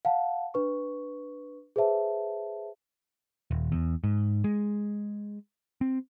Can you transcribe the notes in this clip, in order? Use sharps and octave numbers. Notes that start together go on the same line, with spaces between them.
F5 F#5 A5
D4 B4 C#6
G#4 B4 C5 E5 A5
D#1
E2
G#2
G#3
C4